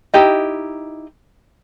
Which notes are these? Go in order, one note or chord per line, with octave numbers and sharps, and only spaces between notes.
D#4 E4 G4 D#5